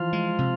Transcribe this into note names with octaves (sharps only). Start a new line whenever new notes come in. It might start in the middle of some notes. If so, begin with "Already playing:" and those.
Already playing: E3 F3 F4
G#3
C3